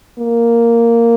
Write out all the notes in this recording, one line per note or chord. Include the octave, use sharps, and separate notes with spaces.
A#3